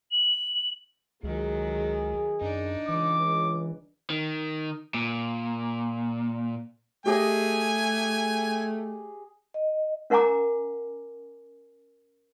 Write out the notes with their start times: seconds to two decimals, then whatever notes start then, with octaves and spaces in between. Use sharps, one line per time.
0.11 F#7
1.23 C#2 D#3 F#3 G#4
2.41 F#2 D4 D#4
2.88 C#2 E3 D6
4.10 D#3
4.94 A#2
7.06 A3 G4 G#4 D#5 G#5
9.54 D#5
10.10 C#4 A#4 F#5 G#5 A#5 D6